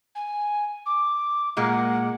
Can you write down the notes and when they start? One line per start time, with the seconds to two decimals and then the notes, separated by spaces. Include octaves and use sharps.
0.15 G#5
0.86 D6
1.57 A#2 G#3 A#3 F#5